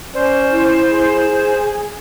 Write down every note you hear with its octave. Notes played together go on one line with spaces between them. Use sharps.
C#4 C5 D5
E4
G#4